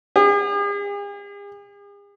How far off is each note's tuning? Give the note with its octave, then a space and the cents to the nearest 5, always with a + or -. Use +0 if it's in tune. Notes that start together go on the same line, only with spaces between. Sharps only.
G#4 -45